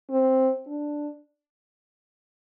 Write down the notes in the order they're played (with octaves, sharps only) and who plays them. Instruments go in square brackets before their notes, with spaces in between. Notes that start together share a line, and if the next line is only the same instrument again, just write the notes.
[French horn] C4
D4